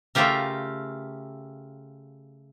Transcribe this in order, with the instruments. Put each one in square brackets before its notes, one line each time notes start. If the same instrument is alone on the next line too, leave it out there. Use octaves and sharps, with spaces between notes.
[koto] C#3 A3 F4 G4 A#4